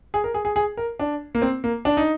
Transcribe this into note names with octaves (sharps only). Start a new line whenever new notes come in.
G#4
A#4
G#4
G#4
G#4
A#4
D4
A#3
C4
A#3
D4
D#4